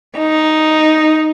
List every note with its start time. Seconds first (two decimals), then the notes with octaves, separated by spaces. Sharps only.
0.18 D#4